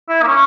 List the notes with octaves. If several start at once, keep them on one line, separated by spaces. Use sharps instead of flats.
E4
A#3
C#4